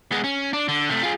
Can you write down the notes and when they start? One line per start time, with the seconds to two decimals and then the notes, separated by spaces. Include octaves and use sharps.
0.12 G#3 B3
0.24 C#4
0.53 D4
0.68 D3
0.89 C3 A3
1.03 F4 G#4